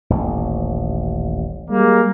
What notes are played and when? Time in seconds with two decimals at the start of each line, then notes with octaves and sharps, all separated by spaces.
0.10 D#1 A1
1.70 G3 G#3 A#3